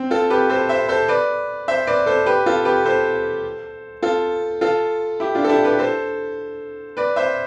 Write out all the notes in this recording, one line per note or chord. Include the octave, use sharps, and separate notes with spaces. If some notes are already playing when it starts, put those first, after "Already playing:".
Already playing: C4
F4 A4
G4 B4
A4 C5
C5 E5
A4 C5
B4 D5
C5 E5
B4 D5
A4 C5
G4 B4
F4 A4
G4 B4
A4 C5
F4 A4
F4 A4
E4 G4
D4 F4
A4
E4 G4
G4 B4
A4 C5
B4 D5
C5 E5